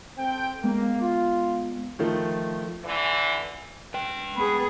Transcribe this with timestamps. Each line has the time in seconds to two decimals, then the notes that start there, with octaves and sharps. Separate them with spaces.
0.18 C4 A4 G5
0.64 G#3 A#3 B3
1.01 F4
1.99 D#3 F3 A3
2.85 D3 E3
3.94 B4 G5
4.36 B3 G#4 B5